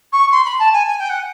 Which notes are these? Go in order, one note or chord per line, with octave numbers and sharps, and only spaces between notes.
C#6
C6
B5
A5
G#5
G#5
G5
F#5